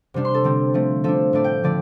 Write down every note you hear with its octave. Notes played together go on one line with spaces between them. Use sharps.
C3 G3 D4
C6
A4
D3 G3 C4
F3 A3 C4
F3 D4 A4
A2 A3 D4 D5
G5
D3 F3 A3 D5